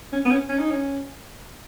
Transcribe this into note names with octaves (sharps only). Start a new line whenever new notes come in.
C#4
B3
C#4
C#4
D#4
C#4